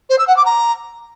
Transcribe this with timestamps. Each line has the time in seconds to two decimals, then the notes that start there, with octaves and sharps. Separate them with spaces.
0.10 C5
0.19 E6
0.28 F#5
0.36 D6
0.45 A#5